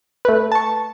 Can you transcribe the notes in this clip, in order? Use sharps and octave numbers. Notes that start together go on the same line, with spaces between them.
A3 B4
A5 C#6